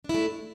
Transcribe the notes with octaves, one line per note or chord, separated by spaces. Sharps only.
A3 D4 E4